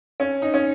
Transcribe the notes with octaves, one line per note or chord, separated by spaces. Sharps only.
C#4
D#4
C#4